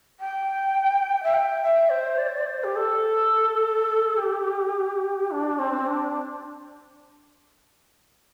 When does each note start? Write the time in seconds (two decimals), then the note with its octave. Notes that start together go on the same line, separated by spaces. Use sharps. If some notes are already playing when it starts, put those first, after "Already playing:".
0.20 G5
1.23 E5
1.34 G5
1.62 E5
1.89 C5
2.18 D5
2.28 C5
2.37 D5
2.46 C5
2.64 G4
2.76 A4
4.17 G4
5.31 D4
5.59 C4
5.86 D4